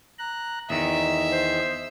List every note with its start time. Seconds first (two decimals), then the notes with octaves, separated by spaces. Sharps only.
0.19 A#5 F#6
0.70 E2 D#3 D#5 E5
1.32 C5